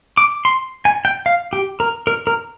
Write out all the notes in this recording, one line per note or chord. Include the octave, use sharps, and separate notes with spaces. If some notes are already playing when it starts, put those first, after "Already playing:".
D6
C6
G#5
G5
F5
G4
A#4
A#4
A#4